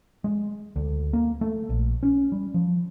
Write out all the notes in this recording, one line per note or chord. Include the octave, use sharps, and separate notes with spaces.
G#3
D2
A#3
A3
A#1
C#4
G3
F3